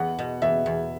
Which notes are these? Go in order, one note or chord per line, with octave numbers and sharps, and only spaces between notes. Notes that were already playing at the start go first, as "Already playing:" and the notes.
Already playing: E2 F#5
B2
E2 E5
E2